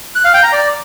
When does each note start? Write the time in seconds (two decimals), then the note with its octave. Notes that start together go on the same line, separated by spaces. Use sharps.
0.15 F#6
0.25 F5
0.34 G5
0.43 A#5
0.52 D5